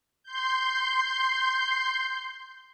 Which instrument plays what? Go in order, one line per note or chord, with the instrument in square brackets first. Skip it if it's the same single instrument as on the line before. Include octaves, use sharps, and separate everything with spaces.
[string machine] C6 G6